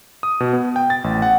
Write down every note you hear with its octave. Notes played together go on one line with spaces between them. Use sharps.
D#6
B2
B3
G5
A6
A1
F#5